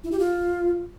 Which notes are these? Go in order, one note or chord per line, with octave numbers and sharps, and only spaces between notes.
E4
G4
F4